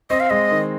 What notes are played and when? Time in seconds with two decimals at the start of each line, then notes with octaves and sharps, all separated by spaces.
0.10 C4 D#5
0.20 F5
0.30 G#3 D#5
0.51 D#3